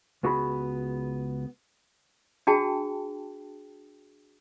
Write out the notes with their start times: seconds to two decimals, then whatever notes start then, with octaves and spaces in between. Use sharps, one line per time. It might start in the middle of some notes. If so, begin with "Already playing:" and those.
0.23 C#2 B3 F#4 G#4 A#5 B5
2.47 D4 F#4 G#4 G5 A5